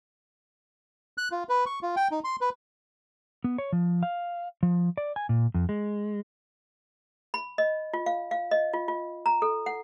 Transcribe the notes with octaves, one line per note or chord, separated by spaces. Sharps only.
F#6
F4
B4
C#6
F4
G5
D#4
C6
B4
B3
C#5
F3
F5
F3
D5
G#5
A#2
F2
G#3
B5
D#5
F4
F5
F5
D#5
F4
F4
A#5
A4
F#5